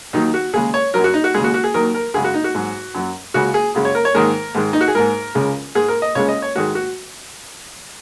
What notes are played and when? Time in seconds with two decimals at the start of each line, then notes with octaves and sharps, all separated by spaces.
0.13 D#2 D#3 F#3 D#4
0.34 F#4
0.53 D#2 C#3 G#3 G#4
0.74 C#5
0.94 F#2 F#3 A#4
1.04 F#4
1.14 D#4
1.24 F#4
1.34 D#2 C#3 G#3 G#4
1.44 F#4
1.54 F#4
1.64 G#4
1.74 D#2 D#3 F#3 A#4
1.94 A#4
2.14 F#2 C#3 G#3 G#4
2.24 F#4
2.34 D#4
2.44 F#4
2.55 G#2 F#3
2.95 F#2 F#3
3.34 C#2 C#3 G#3 F#4
3.54 G#4
3.75 F#2 C#3 G#3
3.85 C#5
3.95 A#4
4.05 C#5
4.14 G#2 D#3 G#3 A#4
4.55 G#2 D#3 G#3
4.73 D#4
4.81 F#4
4.88 G#4
4.95 G#2 G#3 A#4
5.35 C#2 C#3 G#3
5.75 G#2 G#3 G#4
5.88 A#4
6.02 D#5
6.15 C#2 C#3 G#3 C#5
6.28 D#5
6.42 C#5
6.56 G#2 D#3 G#3 F#4
6.75 F#4